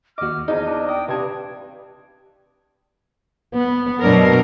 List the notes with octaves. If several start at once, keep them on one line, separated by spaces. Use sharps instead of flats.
D#2 F#4 D#5 D6 F6
E2 F3 D#4 G#4 D#5
D4
D5 G5 D#6
G2 C3 B4 A5 G#6
B3
F#2 B2 F#3 D4 A#4